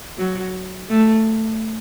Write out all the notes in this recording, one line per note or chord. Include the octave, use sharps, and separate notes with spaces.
F#3
A3